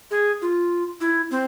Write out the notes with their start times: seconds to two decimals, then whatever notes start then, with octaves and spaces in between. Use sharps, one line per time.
0.11 G#4
0.42 F4
1.01 E4
1.31 C4